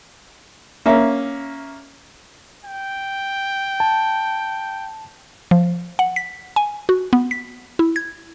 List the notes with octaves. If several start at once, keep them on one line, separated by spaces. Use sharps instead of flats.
A#3 C#4 E5
G5
A5
F3
F#5
B6
G#5
F#4
B3
B6
E4
G#6